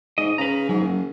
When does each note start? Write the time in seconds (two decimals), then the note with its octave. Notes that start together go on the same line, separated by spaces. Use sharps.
0.18 G#2 D#5
0.38 C#3 B4 A#5
0.69 G#2 F#3
0.80 F#1